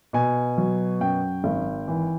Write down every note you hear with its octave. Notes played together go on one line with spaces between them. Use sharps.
B2 G#5
F#3
F#2 G5
G#1
E3